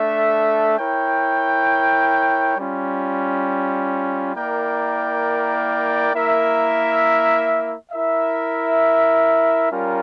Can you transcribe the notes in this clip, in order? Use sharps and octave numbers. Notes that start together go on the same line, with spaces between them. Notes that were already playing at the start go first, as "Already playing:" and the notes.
Already playing: A3 D4 A4 E5
E4 A#4 C#5 G5
G3 C#4 F4
A#3 E4 A#4 D5 G5
A#3 E4 A#4 E5
E4 A#4 E5
G3 C#4 F4 A#4